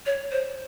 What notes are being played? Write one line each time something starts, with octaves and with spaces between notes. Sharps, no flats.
C#5
C5